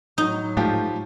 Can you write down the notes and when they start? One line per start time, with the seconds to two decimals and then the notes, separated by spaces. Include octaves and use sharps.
0.18 A2 F#3 D#4
0.57 G#2 F3 A3 F4 G4